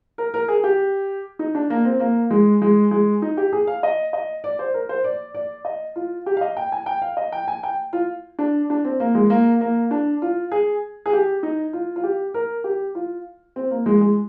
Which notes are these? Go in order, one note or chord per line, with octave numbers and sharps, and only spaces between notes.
A#4
A#4
G#4
G4
D#4
D4
A#3
C4
A#3
G#3
G#3
G#3
D#4
G4
G#4
F5
D#5
D#5
D5
C5
A#4
C5
D5
D5
D#5
F4
G4
F5
D#5
G5
G#5
G5
F5
D#5
G5
G#5
G5
F4
D4
D4
C4
A#3
G#3
A#3
A#3
D4
F4
G#4
G#4
G4
D#4
F4
F4
G4
A#4
G4
F4
C4
A#3
G#3
G#3